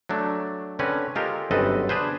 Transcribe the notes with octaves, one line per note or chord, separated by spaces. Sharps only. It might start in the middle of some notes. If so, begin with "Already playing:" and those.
F#3 A3 D4
D3 C4 C#4 B4
G#3 F4 G4 A4 A#4
G1 F#2 C4 A4 B4 D#5
D4 G#4 B4 C5